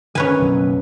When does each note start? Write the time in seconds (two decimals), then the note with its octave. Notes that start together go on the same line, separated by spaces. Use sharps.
0.15 D#3 C#4 B4 G#5
0.39 F#1 B1 F#2